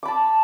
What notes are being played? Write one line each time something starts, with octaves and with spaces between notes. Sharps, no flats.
A5 B5 D6